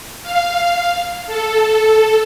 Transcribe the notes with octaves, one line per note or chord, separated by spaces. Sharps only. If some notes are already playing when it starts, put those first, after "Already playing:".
F5
A4